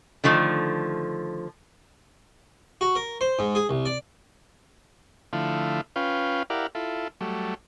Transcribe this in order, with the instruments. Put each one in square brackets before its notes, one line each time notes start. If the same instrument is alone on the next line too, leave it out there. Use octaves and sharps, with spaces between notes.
[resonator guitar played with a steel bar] D3 D#3 F3 A3
[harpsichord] F#4
A#4
C5
G#2
G#4
C2
D5
[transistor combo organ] D3 F3 A3 E4 F5
C#4 F4 B4 F5 G5
E4 G4 A#4 D5 F5 F#5
E4 F4 A4
F#3 G3 A3